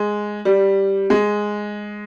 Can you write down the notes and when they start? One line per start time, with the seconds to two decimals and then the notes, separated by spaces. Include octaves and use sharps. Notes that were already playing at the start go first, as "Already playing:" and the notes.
Already playing: G#3
0.45 G3
1.10 G#3